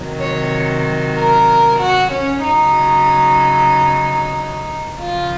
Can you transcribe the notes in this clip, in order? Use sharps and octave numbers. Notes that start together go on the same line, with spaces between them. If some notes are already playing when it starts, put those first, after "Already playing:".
Already playing: C3 D#3 F#3
C#5
A#4
F#4
C#4
C#3 F#3 D#4
C#3 F3 F4